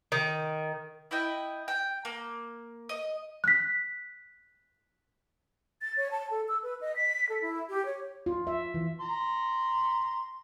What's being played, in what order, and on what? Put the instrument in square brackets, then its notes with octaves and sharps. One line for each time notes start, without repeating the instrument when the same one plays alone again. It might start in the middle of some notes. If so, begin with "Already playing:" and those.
[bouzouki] D#3
[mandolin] E4 D#5 G5
G5
A#3
D#5
[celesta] F#6 B6
[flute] A6
C#5
A5
A4
E6
B4
D#5
B6
A4
E4
G4
C#5
[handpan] F4
E5
E3
[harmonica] A#5 C6